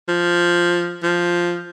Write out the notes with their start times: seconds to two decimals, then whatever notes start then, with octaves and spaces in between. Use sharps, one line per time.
0.08 F3
1.03 F3